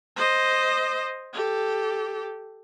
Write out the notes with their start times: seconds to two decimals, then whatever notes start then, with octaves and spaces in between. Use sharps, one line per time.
0.16 C5 D#5
1.33 G4 A4